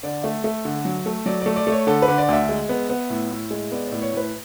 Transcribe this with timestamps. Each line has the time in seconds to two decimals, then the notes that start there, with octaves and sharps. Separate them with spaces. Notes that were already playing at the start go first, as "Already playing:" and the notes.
0.03 D3 D5
0.23 A3 E5
0.44 A3 E5
0.65 D3
0.85 F#3
1.06 A3
1.26 F#3 D5
1.42 A3 D5
1.56 D5
1.67 A3
1.72 C#5
1.87 D3 A4
2.02 B4
2.08 D3
2.18 D5
2.28 D2 E5
2.49 G#3
2.69 B3
2.90 B3
3.10 A2
3.31 A2
3.51 G#3
3.72 B3 D5
3.87 A2 D5
4.02 C#5
4.13 A2 B4